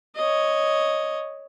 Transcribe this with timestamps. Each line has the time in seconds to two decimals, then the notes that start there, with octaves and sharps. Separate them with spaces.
0.16 C#5 D#5